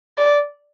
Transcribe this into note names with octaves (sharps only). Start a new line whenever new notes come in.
D5